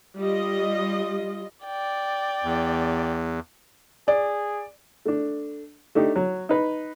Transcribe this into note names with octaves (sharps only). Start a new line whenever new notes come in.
G3 F4 D#5
D5 G5
E2
G#4 D5
A3 D4
A3 D4 D#4 G4
F#3
D#4 B4